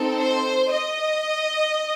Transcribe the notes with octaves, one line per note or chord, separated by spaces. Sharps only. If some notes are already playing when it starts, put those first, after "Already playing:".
Already playing: C4 D#4 A4
C5
D#5